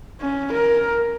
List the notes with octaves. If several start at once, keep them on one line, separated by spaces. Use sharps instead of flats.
C#4
A#4